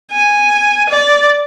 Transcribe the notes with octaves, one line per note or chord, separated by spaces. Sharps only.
G#5
D5